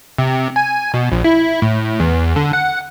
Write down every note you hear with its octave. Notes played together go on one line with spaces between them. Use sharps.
C3
G#5
B2
A#1
E4
A2
E2
D3
F#5